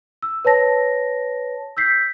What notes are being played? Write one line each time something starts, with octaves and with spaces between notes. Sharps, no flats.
E6
B4 C#5 A5 A#6
E6 G6 B6 C7